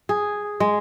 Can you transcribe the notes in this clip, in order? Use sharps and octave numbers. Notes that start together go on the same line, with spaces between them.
G#4
G#3